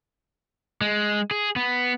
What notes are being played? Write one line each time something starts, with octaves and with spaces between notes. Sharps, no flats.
G#3
G#4
B3